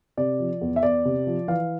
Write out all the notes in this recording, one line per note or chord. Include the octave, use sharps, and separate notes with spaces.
C3 D5
F3
E2
E5
E2 D5
C3
F3
E3 F5